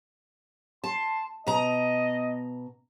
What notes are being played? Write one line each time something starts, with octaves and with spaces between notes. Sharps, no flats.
A5 C6
B2 D#5 A#5